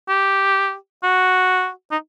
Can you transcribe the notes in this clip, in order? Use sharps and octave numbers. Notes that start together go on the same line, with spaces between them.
G4
F#4
D#4